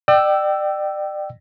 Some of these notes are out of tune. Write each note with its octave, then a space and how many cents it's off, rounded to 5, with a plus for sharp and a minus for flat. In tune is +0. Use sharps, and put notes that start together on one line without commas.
D5 +35 G5 -20 E6 +5